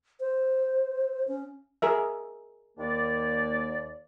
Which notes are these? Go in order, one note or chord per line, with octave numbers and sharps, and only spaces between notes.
C5
C#4
G#4 A#4 E5
D#2 A#3 D5